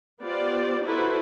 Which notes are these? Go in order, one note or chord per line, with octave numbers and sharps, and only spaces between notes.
B3 F4 G4 C5 D5
D#4 E4 F#4 A4 B4 C5